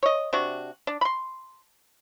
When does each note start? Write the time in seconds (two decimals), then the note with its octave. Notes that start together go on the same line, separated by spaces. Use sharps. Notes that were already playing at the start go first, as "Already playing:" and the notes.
0.03 C#5 D#5
0.33 C3 D4 F#4
0.87 D4
1.01 B5 C6